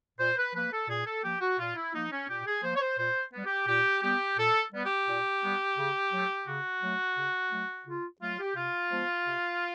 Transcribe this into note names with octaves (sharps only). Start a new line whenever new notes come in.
A#2 C5
B4
F3 A#3 B4
A4
A#2 G#4
A4
F3 A#3 G4
F#4
A#2 F4
E4
F3 A#3 D#4
C#4
A#2 G4
G#4
F3 A#3 C5
C#5
C5
A#2 C5
G3 B3
G4
A#2 G4
G3 B3 G4
A#2 A4
G3 B3
G4
A#2
G3 B3
C#3
F#3 A3
C#3 F#4
F#3 A3
C#3
F#3 A3
C#3 F4
F#3 A3 F4
G4
C3 F4
F3 G#3 B3
C3